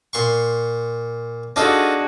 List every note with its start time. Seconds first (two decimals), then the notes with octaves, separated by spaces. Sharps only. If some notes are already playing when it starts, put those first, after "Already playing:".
0.13 A#2 C6 C#6
1.56 D4 D#4 F4 F#4 G#4 A4 D#5